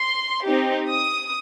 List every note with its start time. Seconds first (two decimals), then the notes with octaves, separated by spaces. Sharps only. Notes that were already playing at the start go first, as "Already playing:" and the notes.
Already playing: C6
0.44 C4 D#4 G4
0.87 D#6